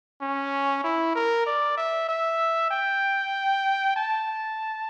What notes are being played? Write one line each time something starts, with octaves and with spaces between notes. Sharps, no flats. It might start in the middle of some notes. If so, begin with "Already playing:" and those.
C#4
E4
A#4
D5
E5
E5
G5
A5